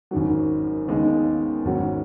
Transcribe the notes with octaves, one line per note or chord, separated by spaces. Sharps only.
G#1 F#2 D#3 F#3
D#2 C#3 G#3 B3 D#4
G#1 G#2 F#3 C#4 F#4